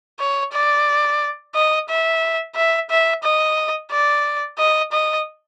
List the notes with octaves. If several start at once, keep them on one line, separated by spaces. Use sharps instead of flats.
C#5
D5
D#5
E5
E5
E5
D#5
D5
D#5
D#5